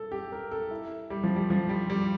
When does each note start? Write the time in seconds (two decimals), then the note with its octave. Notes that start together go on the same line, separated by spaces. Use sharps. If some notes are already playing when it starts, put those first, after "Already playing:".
Already playing: A4
0.12 G4
0.32 A#4
0.51 A4
0.71 E4
1.10 G3
1.23 F3
1.36 G3
1.50 F3
1.69 G3
1.90 G3